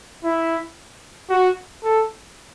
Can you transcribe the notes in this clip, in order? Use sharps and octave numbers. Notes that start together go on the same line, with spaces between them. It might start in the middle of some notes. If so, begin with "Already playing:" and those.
E4
F#4
A4